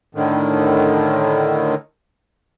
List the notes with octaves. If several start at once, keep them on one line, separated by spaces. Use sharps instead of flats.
A2 D3 D#3